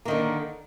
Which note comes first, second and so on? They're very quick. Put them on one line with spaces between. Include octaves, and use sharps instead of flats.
A#3 D#3 D3